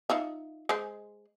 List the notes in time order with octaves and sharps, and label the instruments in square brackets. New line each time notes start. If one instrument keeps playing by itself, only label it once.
[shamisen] D#4 F4 E5
G#3 C5